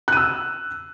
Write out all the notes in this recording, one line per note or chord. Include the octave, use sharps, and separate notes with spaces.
E6 F#6 D#7